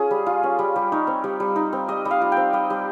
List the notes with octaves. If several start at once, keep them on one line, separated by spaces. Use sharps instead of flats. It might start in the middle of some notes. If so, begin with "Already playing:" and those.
Already playing: C#4 F4 G#4
G3
F4
C#4
G3
G3
D#4 C#5
C4
G3
G3
D#4
C4
G3 D#5
G3
F5
F4
C4 G5
G3 D#5
G3